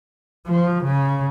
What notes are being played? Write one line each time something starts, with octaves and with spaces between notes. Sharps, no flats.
F3
C#3